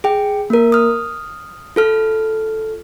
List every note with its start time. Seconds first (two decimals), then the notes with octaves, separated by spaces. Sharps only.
0.04 G#4 G5
0.50 A#3 A#4
0.72 D#6 F6
1.76 F4 A4 F6